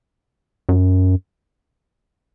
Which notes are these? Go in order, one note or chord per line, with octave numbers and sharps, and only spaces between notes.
F#2